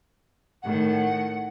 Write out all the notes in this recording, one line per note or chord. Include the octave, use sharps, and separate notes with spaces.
A2 D#3 F#5